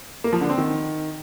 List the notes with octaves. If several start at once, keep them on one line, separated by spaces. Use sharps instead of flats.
A#3
F3
D3
C4
D#3